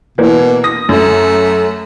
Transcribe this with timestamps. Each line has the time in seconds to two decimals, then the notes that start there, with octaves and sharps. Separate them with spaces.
0.18 B2 E3 A#3
0.64 D#6 A#6
0.89 F#2 A3